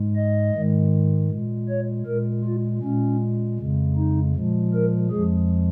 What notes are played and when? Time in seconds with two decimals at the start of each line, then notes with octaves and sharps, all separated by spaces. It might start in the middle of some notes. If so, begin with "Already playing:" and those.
Already playing: G#2 G#3
0.16 D#5
0.55 G#2 D#3 G#3
1.30 A#2 G#3
1.69 C#5
2.06 A#2 G#3 A#4
2.44 F4
2.83 A#2 G#3 C#4
3.59 F2 C#3 G#3
3.96 D#4
4.34 A#2 F3 G#3
4.74 A#4
5.11 F2 F3 G#3 G#4